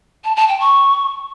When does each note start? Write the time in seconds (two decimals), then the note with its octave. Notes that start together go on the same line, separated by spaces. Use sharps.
0.24 A5
0.36 A5
0.48 G5
0.60 C#6